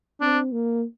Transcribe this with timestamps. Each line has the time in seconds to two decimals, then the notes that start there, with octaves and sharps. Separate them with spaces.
0.21 C4 D4
0.52 A#3